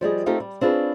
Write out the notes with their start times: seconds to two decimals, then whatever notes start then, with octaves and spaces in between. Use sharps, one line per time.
0.01 F3 G3 G#4 D#5
0.26 A3 C4 D#4 F4 G4 A4
0.40 G3
0.61 C4 D4 F4 G#4 B4 C#5